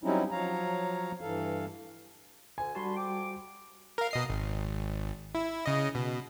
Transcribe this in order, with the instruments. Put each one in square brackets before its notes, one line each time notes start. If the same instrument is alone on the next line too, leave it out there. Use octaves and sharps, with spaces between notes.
[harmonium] F#3 G3 C4 C#4 D#4 E4
F3 F#3 C#5 F5 A#5
G2 E3 A4 F5
[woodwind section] D2 D3 [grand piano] G#5
[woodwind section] D3 B5 C6 [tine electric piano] G3 F#4 A5
[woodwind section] F2 G5 D6
[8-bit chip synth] A#4 F5
B2 D#5 C7
G#1
E4
C#3 D#5
B2